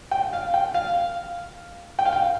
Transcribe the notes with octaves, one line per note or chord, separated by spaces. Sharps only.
G5
F5
G5
F5
G5
F5
G5